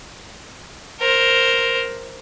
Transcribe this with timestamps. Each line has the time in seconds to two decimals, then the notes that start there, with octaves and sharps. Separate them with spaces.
1.00 A#4 C5